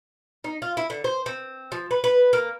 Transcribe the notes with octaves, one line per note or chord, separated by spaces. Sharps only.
D#4
F4
E4
D3
C5
C4
F3
B4
B4
A#3